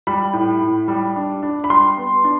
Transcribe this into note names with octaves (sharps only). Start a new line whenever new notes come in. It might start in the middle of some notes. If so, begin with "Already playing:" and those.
G3 B5
A2
A2
G3
D4
D4
B5
G3 C6
B3
D4